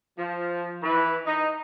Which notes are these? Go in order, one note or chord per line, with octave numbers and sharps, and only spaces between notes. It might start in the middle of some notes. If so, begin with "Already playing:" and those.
F3
E3 B4
D#4